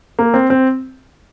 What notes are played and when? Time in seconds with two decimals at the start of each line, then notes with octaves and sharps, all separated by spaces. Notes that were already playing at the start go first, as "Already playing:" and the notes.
0.19 A#3
0.34 C4
0.50 C4